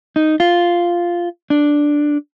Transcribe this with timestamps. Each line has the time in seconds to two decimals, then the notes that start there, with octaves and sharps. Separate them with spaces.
0.16 D#4
0.40 F4
1.50 D4